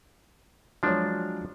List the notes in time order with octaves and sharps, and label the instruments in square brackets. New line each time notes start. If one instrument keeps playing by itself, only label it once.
[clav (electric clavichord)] F3 D4 [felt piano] F#3 G#3 C#5